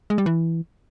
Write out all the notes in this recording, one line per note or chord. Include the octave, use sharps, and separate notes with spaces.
G#3
G3
E3